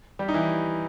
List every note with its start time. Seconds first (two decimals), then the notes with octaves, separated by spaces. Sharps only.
0.19 G3 G4
0.28 D#4
0.34 E3 E4